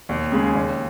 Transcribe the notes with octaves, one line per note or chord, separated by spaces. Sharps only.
D#2
C#3 G#3
D#2